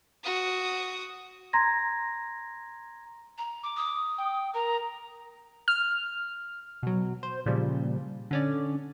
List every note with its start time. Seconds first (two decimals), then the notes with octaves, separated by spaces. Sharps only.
0.23 F#4 D#6
1.53 A#5 C6 G#6 A#6
3.38 A#5
3.63 D6
3.77 D#6
4.18 G5
4.54 A#4 A#5
5.68 F6
6.83 B2 F#3
7.23 C5
7.46 A#2 C#3 F3 G3
8.31 D3 C#4 D5